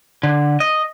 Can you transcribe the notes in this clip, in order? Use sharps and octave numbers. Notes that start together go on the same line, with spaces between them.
D3
D#5